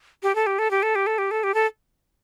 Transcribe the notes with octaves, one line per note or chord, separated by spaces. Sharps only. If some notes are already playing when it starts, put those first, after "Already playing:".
G4
A4
G4
A4
G4
A4
G4
A4
G4
A4
G4
A4